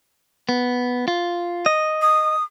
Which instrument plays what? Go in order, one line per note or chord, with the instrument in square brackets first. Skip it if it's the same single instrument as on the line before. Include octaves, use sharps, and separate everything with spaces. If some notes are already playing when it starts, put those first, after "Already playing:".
[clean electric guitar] B3
F4
D#5
[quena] D#6